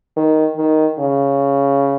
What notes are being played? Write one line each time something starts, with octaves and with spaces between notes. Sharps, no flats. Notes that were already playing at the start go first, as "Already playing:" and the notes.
D#3
D#3
C#3